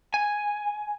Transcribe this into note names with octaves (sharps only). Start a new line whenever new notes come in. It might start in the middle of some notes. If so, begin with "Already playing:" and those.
G#5